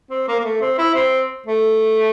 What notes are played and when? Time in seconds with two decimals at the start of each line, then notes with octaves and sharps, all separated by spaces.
0.10 C4
0.28 A#3
0.39 A#3
0.44 A3
0.61 C4
0.78 E4
0.95 C4
1.46 A3